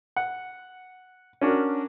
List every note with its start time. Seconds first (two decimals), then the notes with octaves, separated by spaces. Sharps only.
0.16 F#5
1.41 C#4 D4 F#4 A#4